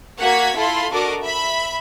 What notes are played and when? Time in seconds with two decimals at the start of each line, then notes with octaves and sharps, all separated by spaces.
0.19 A#3 F#4 F#5 G#6 B6
0.57 E4 F4 A4 B5 C6
0.92 D4 F#4 A4 A#4 D#5 D6
1.23 E5 B5